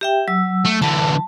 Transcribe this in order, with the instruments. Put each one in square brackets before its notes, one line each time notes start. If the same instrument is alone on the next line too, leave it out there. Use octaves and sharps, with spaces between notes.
[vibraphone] G4 E5 G5
F#3 E6
[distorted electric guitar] A3
[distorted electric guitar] D3 E3 [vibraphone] A5